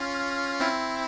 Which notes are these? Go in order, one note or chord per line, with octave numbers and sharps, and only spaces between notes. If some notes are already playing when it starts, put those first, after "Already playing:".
Already playing: C#4 F4
C4 E4